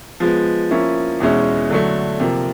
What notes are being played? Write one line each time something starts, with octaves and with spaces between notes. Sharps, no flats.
F3 G#3 B3
F3 A#3 C#4 E4
E2 B2 G#3 C#4 E4
D3 F#3 A3
C3 F3 A#3